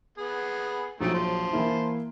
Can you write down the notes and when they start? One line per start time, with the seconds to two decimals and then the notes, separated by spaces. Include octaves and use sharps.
0.18 B3 G#4
1.01 A#1 F#3 A3 D#4 D7
1.14 C5 A5
1.53 E3 A#3 E4